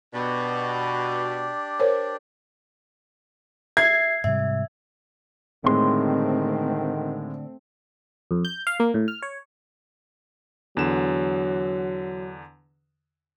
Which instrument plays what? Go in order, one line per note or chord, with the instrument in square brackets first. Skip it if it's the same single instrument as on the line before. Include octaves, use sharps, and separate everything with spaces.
[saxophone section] B2 [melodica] D4 G4 D5
[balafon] A#4 C5 C#5
[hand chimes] E5 C7 [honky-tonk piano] G#6
[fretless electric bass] G#2 C3 G3 [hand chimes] E5
[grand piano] A2 G#3 [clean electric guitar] D3 C6 [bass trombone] D#3 [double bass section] A3 C4
[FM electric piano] F2
G6
F5
A#3
A2
F6
C#5
[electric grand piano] E2 D3 E7 [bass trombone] F#3